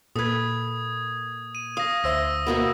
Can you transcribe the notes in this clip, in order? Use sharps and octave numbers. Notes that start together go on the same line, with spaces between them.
A#2 A4 B4 D#6 G#6
D#7
F5 D#6 A#6
D2 C5 E5 E6 A#6
B2 A#3 B3